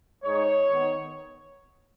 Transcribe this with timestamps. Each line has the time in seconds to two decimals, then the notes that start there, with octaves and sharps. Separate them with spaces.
0.24 G#2 G#3 D#4 C#5
0.71 D#3 B3 D#4